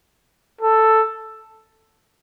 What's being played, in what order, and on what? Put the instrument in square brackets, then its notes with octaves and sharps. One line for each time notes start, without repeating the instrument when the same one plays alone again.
[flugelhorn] A4